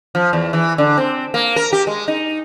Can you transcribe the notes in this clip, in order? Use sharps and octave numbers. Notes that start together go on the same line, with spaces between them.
F3
E2
E3
D3
C4
A#3
A#4
G4
G#3
D#4